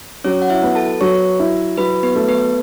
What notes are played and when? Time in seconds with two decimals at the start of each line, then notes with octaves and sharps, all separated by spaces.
0.24 F#3 C#4 C#5
0.42 F#5
0.50 E4 E5
0.63 B3
0.75 A4 A5
1.01 F#3 C#5 C#6
1.39 E4
1.78 F#3 B4 B5
2.03 B3 B4
2.15 A3
2.28 B3 B4